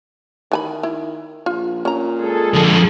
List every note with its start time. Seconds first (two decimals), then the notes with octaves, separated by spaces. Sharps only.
0.52 D#3 E3 G#5 B5
0.83 E4
1.46 A#1 F4
1.85 A#2 C#4 A#5
2.19 G#3 G#4 A4
2.54 D3 F3